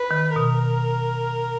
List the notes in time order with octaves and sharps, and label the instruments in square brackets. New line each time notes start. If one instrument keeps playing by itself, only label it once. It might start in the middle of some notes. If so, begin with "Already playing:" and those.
Already playing: [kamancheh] B4
[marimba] D#3
[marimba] B2 [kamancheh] A#4